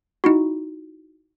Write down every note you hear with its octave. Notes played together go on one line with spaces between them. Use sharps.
D#4 E4 F#4